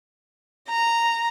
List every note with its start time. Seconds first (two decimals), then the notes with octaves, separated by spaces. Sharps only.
0.68 A#5